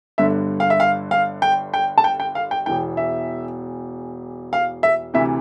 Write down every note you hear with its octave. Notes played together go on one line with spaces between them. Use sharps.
G1 G2 D3 E5
F5
E5
F5
F5
G5
G5
A5
G5
G5
F5
G5
E1 E2 E3 G5
E5
F5
E5
D2 C3 E3 E5